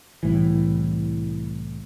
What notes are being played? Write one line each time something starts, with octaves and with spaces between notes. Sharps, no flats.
C2 A2 E3